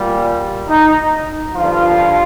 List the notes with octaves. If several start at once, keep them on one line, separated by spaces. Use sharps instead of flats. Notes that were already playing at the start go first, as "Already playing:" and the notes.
Already playing: A#2 G3
D#4
G2 D3 F3 F4